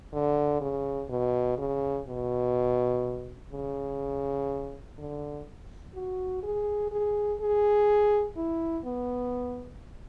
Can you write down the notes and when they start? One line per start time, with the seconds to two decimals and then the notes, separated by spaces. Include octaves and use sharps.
0.13 D3
0.61 C#3
1.10 B2
1.58 C#3
2.07 B2
3.52 C#3
4.98 D3
5.95 F#4
6.43 G#4
6.92 G#4
7.41 G#4
8.37 E4
8.85 B3